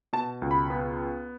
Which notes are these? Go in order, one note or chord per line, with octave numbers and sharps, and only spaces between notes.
B2 A5
C#2
B5
B3